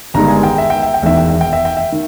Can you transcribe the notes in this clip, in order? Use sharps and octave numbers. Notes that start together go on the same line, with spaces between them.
G1 G2 D#3 G#3 A#5
G#5
G5
E5
G5
E5
G5
E1 E2 D#3 E5
G5
E5
G5
E5
G5
E5
D#3